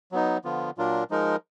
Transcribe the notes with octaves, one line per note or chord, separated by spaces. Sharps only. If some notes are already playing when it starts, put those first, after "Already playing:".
F#3 B3 D#4
D3 F3 B3 F4
A#2 F#3 D4 F4 A#4
F3 G#3 D#4 A#4